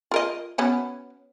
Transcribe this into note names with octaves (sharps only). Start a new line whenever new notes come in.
F4 A#4 D#5
B3 C#4 F#4